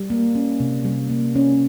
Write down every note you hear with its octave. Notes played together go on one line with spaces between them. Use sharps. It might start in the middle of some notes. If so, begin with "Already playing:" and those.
Already playing: G3
A#3
C#4
C3
G3
A#3
C#4